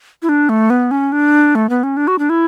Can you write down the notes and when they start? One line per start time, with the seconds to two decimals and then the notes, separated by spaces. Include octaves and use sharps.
0.22 E4
0.29 D4
0.49 A3
0.70 B3
0.91 C#4
1.12 D4
1.55 A3
1.70 B3
1.83 C#4
1.97 D4
2.08 F#4
2.19 D4
2.30 E4